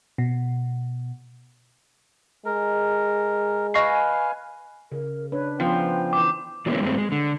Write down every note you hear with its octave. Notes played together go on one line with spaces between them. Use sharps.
B2
G#3 A#4
B4 D#5 F5 G#5 C#6 C7
C#3 A#4
D4 B4 C#5
F3 B3 C#4 C5 G5
E3 C5 D6
E3 F#3 G#3 A#3 B3 C#4
G2 F#3 G#3 A3 C4
G#3
D3